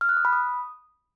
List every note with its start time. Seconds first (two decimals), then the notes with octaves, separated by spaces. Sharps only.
0.01 F6
0.09 F#6
0.17 D#6
0.25 B5
0.33 D#6